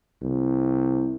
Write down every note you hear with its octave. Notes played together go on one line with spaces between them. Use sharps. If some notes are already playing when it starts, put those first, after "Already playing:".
C2